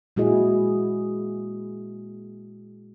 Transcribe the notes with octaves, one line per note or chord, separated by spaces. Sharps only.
A#2 G#3 E4 F#4 G#4 D#5